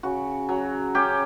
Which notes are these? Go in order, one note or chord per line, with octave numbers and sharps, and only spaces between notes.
C#3 F#4
F#3
C#4 G4